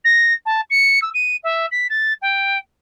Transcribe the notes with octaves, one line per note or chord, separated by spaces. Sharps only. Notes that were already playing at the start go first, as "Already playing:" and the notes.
A#6
A5
C#7
E6
D#7
E5
B6
A6
G5